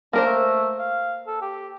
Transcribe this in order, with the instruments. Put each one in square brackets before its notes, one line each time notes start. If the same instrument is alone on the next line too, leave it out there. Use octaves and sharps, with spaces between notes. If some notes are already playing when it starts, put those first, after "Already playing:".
[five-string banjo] A#3 A#4 C5 [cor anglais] D4
[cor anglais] A3
F5
A4
G4